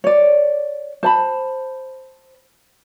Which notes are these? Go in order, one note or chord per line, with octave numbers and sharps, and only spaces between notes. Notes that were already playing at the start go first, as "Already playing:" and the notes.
C#5 D5
C5 A5 B5